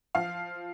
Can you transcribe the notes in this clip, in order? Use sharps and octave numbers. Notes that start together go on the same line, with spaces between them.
F3 F5